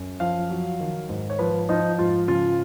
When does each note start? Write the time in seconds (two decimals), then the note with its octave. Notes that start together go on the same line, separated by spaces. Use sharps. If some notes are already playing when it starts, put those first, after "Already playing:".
Already playing: F#2
0.20 F3 F5
0.50 F#3
0.80 D#3
1.09 G#2
1.30 C#5
1.39 F3 B4
1.69 F3 D#4
1.99 G#2 F4
2.28 C#3 F4